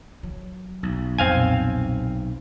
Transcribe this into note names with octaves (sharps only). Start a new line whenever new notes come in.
F#3
B1
F2 A#2 C4 F5 G#5